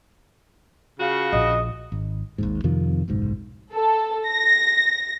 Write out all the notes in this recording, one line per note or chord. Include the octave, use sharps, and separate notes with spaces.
C#3 F4 F#4
A#1 D#5
G#1
G#1 D#2 G#2
F2 C3 D#3 F3
F#1 B1 G#2
A4
A#6